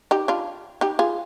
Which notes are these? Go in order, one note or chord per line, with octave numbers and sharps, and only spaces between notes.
D#4 G4
D4 F4
D#4 G4
F4 G#4